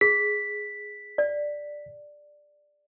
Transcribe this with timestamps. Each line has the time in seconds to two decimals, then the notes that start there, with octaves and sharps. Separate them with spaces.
0.01 G#4 B6
1.18 D5